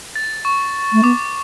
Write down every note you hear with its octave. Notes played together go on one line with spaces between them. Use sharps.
A6
C#6
A3
B3 D6